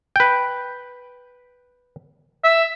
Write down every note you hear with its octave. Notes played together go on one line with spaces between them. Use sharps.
B4 G5
E5